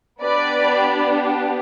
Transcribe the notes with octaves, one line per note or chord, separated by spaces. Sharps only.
B3 D4 G4 B4 D5